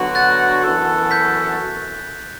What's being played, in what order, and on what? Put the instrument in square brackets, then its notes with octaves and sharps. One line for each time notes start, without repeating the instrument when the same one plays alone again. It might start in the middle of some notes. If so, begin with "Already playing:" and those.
Already playing: [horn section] D3 F#3 B3 F#4
[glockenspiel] F#6 A6
[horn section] F#2 E3 B3 F#4 A4
[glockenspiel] G6 B6